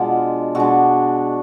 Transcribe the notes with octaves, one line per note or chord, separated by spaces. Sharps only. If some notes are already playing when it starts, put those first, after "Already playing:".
Already playing: B2 G#3 D4 F4
B2 G#3 D4 F#4